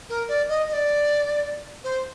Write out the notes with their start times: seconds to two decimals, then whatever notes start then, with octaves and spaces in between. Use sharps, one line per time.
0.09 A#4
0.28 D5
0.48 D#5
0.68 D#5
0.73 D5
1.84 C5